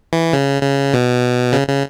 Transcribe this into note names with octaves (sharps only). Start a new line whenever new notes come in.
E3
C#3
C#3
B2
C#3
C#3